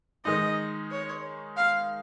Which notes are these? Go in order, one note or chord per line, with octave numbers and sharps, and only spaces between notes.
D#3 G#3 D#4 D#5
C#5
F5